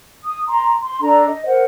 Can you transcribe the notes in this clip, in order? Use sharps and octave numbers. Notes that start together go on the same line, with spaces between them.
D#6
A#5 C6
C6
D4 A4 D5 A#5
D#5
A#4 C5 F#5